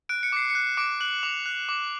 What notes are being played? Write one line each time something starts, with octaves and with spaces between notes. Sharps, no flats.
F#6 D7
C#7
D6 C7
C#7
F#6
D6 D7
F#6 F#7
D6 F7
F#6
D6